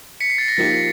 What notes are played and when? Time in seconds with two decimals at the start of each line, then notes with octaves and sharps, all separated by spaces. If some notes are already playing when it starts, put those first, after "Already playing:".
0.20 B6 C#7
0.30 C7
0.38 A6
0.48 A#6
0.57 F3 A#3 D#4 G4 A6